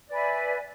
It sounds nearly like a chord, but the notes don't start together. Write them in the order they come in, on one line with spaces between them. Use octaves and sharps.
D5 B4 G#5 E5